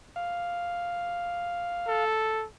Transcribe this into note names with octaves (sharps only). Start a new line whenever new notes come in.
F5
A4